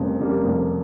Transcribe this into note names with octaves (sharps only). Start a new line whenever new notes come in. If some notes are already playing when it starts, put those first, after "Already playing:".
Already playing: F1 F2 C#3 G3 A#3
F2 C#3 G3 A#3
F1